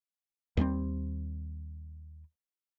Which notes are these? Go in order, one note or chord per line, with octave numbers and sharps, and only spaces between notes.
D#2 G3 G#3 C4